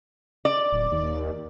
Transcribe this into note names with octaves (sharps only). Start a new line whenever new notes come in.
D5
D1
D#2